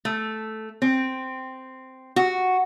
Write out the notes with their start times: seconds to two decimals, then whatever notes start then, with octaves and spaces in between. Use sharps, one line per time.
0.05 A3
0.82 C4
2.16 F#4